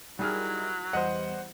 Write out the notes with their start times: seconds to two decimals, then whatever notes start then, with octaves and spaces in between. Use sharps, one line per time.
0.19 F#3 G3 D#4 E4 G#4 A#4 F6
0.93 E2 E3 G3 C5 D#5 F#5